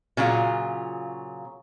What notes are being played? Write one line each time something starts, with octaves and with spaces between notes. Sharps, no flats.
A#2 C#3 F#3 F4